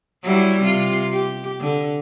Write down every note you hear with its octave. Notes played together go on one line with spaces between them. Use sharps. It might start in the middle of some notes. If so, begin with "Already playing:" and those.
F#3 G3 E4
C3 F4
G4
D3